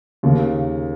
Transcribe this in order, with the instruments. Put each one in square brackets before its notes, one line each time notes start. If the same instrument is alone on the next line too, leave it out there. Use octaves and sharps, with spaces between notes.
[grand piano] D#2 C#3 A#3